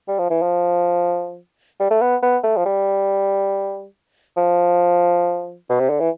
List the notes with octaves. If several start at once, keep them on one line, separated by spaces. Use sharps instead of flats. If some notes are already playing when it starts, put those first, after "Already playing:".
G3
F3
E3
F3
G3
A3
B3
B3
A3
F3
G3
F3
B2
C3
D3
E3